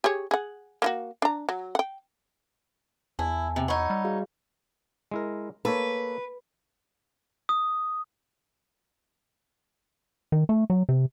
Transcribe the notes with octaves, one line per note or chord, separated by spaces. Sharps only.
G4 G#4 C#5
G#4 F#5
A#3 F4 F#4
D4 A#5
F#3
F#5 G5
E2 E4 G#5 A5
C3
D#4 C#5 F#5 B5 E6
G3
F#4 G#4 F5
G#3 E4 A#4
A#3 A4 B4 C#5
D#6
D#3
A3
F#3
C3